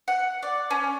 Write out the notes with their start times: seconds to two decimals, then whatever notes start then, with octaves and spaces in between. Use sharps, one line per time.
0.08 F#5
0.43 D5
0.71 C#4